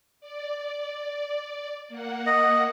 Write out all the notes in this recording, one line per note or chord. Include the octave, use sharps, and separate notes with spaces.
D5
A#3 F#5
D#5